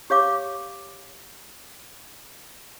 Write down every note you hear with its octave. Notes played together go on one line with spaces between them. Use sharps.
G4 C#5 F5 D6